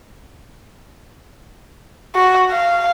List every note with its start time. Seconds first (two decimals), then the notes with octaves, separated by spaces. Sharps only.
2.15 F#4
2.51 F5